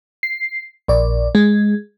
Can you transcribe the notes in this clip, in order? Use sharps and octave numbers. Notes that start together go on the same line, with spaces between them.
C7
A#1 D5
G#3